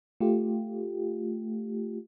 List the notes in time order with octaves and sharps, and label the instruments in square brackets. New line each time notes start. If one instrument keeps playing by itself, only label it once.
[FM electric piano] A3 F4 G4